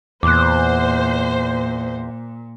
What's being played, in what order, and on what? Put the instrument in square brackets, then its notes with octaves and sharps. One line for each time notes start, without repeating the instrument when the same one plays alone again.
[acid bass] E2 [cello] A#2 [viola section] C5 [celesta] D6 F#6